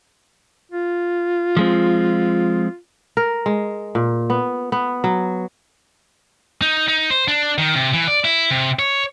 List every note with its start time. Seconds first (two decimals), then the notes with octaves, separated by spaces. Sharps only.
0.72 F4
1.57 F3 G#3 C4
3.17 A#4
3.46 G#3
3.95 A#2
4.30 B3
4.72 B3
5.04 F#3
6.62 D#4
6.88 D#4
7.10 C5
7.28 D4
7.58 D#3
7.75 C3
7.93 E3
8.08 D5
8.25 E4
8.51 C3
8.79 C#5